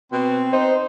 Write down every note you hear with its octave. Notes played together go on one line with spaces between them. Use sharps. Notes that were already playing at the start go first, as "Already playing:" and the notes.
B2 C4
D#4 C5